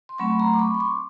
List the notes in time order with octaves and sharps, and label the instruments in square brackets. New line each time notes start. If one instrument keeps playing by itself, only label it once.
[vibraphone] C6
F#3 A3 C4 B5 C#6
A#5 C6
D6
B5 C#6
C#6
C6 D6